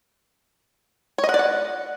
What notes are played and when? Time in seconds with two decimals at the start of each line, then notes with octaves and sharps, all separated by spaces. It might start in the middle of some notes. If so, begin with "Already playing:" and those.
1.18 C#5
1.24 D#5
1.29 F#5
1.34 D5
1.39 F#5